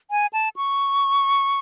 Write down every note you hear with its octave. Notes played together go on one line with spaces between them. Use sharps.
G#5
A5
C#6